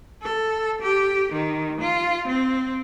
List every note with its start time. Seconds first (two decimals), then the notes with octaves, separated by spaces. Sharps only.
0.22 A4
0.82 G4
1.33 D#3
1.81 F4
2.28 C4